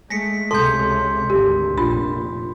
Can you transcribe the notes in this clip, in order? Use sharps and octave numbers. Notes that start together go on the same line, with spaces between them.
G#3 A3 G#5 A#6 B6 C#7
C#2 C3 A4 G5 A5 C6 G6
G#1 D2 G4
F1 A#1 D4 F4 G5 B5